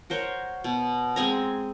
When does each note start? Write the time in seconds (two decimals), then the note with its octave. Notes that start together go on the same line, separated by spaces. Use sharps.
0.10 F#4 A#4 C5 C#5
0.64 B2
1.16 G#3 C4 G#5 A#5